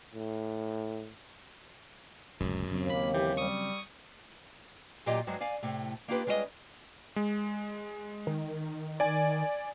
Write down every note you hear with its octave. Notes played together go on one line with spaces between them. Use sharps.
A2
D1 C#2 F#2
D#2 C#3 F#3 C4
A#3 B5
E3 G4
G3 C#6 D#6
A#2 F#3 F4 G4 D5 D#5
G2 F#3 G#3 C5
D5 F5 G#5
A2 C3 A3
A#3 D4 D#4 F4 G4 B4
G3 G#3 C#4 F4 B4 D#5
G#3
D#3
D5 G#5